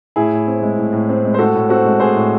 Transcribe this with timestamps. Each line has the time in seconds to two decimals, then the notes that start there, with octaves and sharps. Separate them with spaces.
0.16 A2 E4 G#4
0.32 A2
0.47 C4
0.62 G#3
0.78 A2
0.93 A2
1.09 C4
1.24 G#3
1.34 C5
1.38 A2 F#4 A4
1.55 A2
1.69 C4 F#4 A4
1.86 G#3
2.00 A2 G#4 C5
2.16 A2